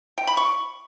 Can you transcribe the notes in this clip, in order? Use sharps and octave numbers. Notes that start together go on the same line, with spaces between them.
G5
B5
C#6